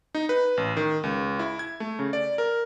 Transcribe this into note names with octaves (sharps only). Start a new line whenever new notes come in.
D#4
B4
A1
D#3
C#2
E4
G#6
A3
C#3
D5
A#4